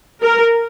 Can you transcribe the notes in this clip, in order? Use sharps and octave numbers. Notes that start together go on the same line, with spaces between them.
A#4